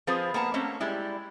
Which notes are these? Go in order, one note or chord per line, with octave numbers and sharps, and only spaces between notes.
F3 C4 F4 G#4 B4 C5
A#3 B3 A5 A#5
A3 A#3 C4 C#4
G3 G#3 E4